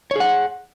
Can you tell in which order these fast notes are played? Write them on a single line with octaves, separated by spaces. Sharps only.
C#5 G#4 F#5